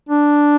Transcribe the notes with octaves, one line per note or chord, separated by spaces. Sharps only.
D4